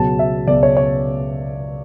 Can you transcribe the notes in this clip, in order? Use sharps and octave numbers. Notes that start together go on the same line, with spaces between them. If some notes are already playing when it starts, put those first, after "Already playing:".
Already playing: C#2 B2 F#3 A5
E5
C#2 B2 F#3 D5
C#5
C#5